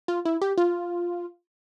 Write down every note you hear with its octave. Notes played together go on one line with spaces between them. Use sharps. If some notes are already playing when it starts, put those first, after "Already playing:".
F4
E4
G4
F4